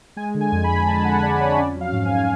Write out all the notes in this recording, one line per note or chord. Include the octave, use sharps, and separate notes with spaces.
G#3 G#5
D3
G#5
F2
B5
F2
G#3 A5
D3 F#5
F2 D5
F2 C#5
C#4 D5
F#3 F5
G#2
G#5
G#2